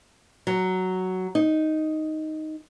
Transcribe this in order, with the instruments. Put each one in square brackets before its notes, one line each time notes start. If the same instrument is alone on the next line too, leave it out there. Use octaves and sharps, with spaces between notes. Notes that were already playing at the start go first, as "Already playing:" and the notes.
[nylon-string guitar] F#3
D#4